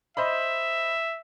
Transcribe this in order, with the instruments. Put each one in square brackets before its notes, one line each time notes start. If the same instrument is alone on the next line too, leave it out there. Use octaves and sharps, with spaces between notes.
[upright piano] C5 D#5 B5 [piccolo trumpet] E5